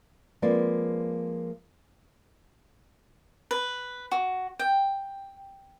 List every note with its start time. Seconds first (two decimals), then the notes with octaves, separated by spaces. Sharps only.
0.42 F3 G#3 A#3 C4 B4 D5
3.51 B4
4.11 F#4
4.59 G5